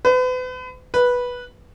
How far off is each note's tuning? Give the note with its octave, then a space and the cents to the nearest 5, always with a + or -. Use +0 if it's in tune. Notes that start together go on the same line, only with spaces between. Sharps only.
B4 +40
B4 -10